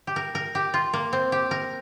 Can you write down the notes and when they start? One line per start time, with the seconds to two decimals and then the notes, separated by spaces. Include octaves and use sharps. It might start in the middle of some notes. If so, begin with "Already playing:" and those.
0.07 G4
0.16 A#4
0.35 A#4
0.55 G4
0.74 F4
0.94 A#3
1.13 C4
1.32 G4
1.51 A#4